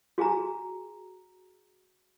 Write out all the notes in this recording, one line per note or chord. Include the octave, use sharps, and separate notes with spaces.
F#4 G#4 G#5 A#5